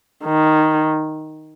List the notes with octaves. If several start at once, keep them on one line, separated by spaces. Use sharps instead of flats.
D#3